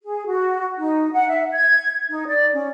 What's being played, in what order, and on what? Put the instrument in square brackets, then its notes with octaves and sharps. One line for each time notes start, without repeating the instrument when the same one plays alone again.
[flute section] G#4
F#4
D#4
F#5
E5
G#6
D#4
D5
C#4